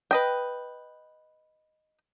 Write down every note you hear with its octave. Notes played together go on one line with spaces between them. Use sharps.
B4 D#5 G5